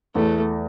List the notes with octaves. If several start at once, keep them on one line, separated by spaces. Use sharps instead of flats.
E2 A3